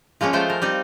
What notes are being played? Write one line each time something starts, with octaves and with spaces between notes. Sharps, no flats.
F3 G#3 A#3 C#4
G#3 A3 F4 C5 G5
A#4
G3 C4 D#4